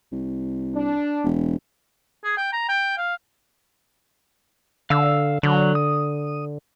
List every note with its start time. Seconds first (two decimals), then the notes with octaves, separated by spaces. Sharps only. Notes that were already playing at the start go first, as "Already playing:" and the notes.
0.12 C2
0.75 D4
1.24 E1
2.24 G#4
2.37 G5
2.53 A#5
2.69 G5
2.98 F5
4.90 D3 F5 E6
5.43 D3 F#3
5.75 D#6